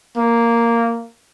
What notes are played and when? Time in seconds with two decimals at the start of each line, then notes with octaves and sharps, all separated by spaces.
0.17 A#3